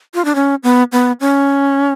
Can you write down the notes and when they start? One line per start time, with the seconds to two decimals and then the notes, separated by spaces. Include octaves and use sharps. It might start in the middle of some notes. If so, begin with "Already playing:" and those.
0.14 F4
0.25 D4
0.35 C#4
0.63 B3
0.92 B3
1.20 C#4